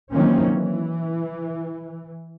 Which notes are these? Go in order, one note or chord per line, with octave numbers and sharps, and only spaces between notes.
D#3 E3 F#3 A#3 C4 C#4
E3